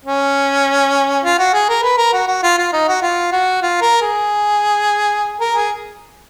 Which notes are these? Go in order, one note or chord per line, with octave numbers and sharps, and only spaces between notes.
C#4
F4
F#4
G#4
A#4
B4
A#4
F#4
F#4
F4
F4
D#4
F#4
F4
F#4
F4
A#4
G#4
A#4
G#4